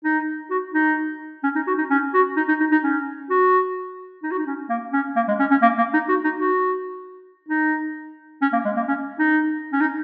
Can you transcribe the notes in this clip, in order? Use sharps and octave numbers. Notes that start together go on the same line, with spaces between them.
D#4
F#4
D#4
C#4
D#4
F#4
D#4
C#4
F#4
D#4
D#4
D#4
D#4
C#4
F#4
D#4
F#4
D#4
C#4
A#3
C#4
A#3
G#3
C#4
C#4
A#3
A#3
D#4
F#4
D#4
F#4
D#4
C#4
A#3
G#3
A#3
C#4
D#4
C#4
D#4